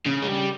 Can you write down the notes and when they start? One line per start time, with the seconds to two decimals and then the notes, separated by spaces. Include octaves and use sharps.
0.06 C#3
0.22 G#3
0.27 G3